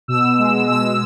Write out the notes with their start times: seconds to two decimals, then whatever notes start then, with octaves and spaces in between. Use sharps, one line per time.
0.08 B2 E6
0.24 B2
0.38 G#3
0.54 B2
0.70 B2 E6
0.85 G#3